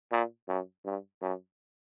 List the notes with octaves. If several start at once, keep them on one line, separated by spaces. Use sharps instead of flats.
A#2
F#2
G2
F#2